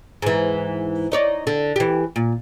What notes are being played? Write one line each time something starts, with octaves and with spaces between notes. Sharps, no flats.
G#2 E3
D#4 C#5 D5
D3
E3 G4
A#2